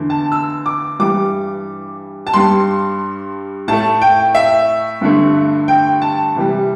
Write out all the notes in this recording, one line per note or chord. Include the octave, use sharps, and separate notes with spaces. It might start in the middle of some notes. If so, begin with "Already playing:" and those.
Already playing: E2 D3 A3
A5
E6
D6
G2 E3 G3 D6
A5
G2 G3 C6
A2 A3 A5
G5
E5
G2 D3 A3
G5
A5
C3 E3 G3